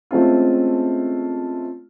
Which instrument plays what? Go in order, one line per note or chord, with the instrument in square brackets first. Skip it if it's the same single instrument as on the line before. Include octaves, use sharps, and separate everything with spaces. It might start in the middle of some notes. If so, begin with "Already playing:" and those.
[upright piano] G#3 A3 C4 C#4 F4